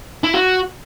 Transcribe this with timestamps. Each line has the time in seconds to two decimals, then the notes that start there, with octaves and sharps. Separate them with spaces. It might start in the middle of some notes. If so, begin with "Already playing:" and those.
0.24 E4
0.34 F#4